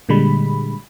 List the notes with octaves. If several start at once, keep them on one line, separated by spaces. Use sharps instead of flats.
A#2 D3 G3 G#3 B5